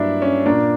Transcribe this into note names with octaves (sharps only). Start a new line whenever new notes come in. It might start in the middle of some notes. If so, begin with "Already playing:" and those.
Already playing: G2 F#3 A#3 D4 E4
C#4
A#2 A#3 D4